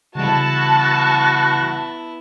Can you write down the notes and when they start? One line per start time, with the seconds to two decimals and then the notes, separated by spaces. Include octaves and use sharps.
0.15 C#3 E3 G3 B3 E4 F#4 A5